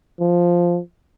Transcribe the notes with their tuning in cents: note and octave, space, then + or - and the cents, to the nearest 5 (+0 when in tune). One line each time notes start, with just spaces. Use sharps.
F3 +0